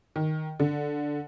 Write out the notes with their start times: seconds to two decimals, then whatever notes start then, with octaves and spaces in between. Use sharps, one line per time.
0.16 D#3
0.60 D3